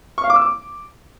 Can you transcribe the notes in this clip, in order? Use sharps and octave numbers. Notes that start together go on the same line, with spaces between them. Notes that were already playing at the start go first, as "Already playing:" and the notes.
C#6
F5
D6
E6
D6